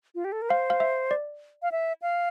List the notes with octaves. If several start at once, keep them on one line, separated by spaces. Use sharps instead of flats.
F4
G4
A4
A#4
C5 F5
F5
E5
D5
F5
E5
F5